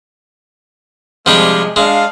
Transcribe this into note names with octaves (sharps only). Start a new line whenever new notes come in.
C3 F3 G3 G#3 D4
G#3 D4 F5